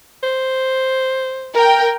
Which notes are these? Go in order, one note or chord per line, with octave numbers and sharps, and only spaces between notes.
C5
A#4 G5